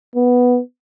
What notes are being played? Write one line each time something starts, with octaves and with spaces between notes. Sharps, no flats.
B3